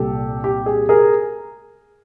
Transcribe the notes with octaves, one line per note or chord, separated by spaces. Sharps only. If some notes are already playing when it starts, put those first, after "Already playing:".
Already playing: C2 A#2 G3 G4 A4
G4
G#4
G#4 A#4